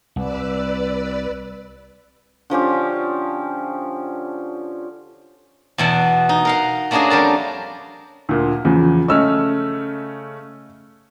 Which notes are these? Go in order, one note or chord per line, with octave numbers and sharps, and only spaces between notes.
C2 B4 D5 E6
D3 F3 C#4 G4
E2 B2 F#5 A5
D#4
A#4 F5 F#5
A3 A#3 C#4 D4 F#4 G#4
F2 G3 A#4 A5
D2 A#2
E2 C#3 F3
C#3 A3 C#4 D#5 E6 F6